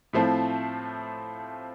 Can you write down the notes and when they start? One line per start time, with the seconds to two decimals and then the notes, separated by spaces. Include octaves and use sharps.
0.13 A2 F3 A3 C4